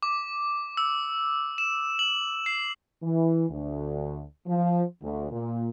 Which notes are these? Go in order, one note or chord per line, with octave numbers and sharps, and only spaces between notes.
D6
E6
E7
F#7
C7
E3
D2
F3
D2
A#2